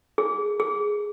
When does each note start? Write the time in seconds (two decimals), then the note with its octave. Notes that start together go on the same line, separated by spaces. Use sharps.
0.18 G#4
0.60 G#4